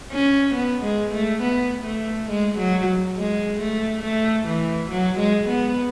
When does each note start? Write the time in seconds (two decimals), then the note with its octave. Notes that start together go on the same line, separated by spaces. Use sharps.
0.12 C#4
0.55 B3
0.84 G#3
1.14 A3
1.42 B3
1.86 A3
2.30 G#3
2.59 F#3
3.16 G#3
3.60 A3
4.03 A3
4.47 E3
4.91 F#3
5.19 G#3
5.48 B3